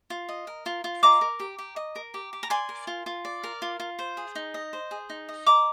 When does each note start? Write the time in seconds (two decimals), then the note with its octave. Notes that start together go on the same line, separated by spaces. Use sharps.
0.10 F4
0.29 D#5
0.47 A#4
0.66 F4
0.84 F4
1.03 D#5 A#5 D6
1.21 A#4
1.40 G4
1.59 G4
1.76 D#5
1.96 A#4
2.14 G4
2.33 G4
2.43 A#5
2.50 D5 G#5 C6
2.69 A#4
2.87 F4
3.06 F4
3.25 D5
3.44 A#4
3.62 F4
3.80 F4
3.99 C5
4.17 G#4
4.35 D#4
4.54 D#5
4.73 C5
4.91 G#4
5.10 D#4
5.29 D#5
5.46 D#5 A#5 D6